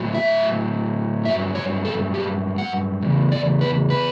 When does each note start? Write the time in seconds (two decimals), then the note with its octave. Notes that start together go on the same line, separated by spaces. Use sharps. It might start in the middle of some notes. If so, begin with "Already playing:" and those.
Already playing: A2 F#3
0.15 E5
1.25 G2 F#3 E5
1.55 C#5
1.85 A4
2.14 G4
2.58 F#5
3.02 E2 C#3
3.32 D5
3.61 B4
3.90 B4